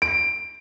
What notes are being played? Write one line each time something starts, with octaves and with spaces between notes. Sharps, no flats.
D7